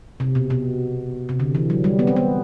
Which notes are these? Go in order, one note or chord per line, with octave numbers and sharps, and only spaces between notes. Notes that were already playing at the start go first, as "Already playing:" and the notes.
C3
B2
B2
C3
D3
E3
F#3
G3
B3
C4
B3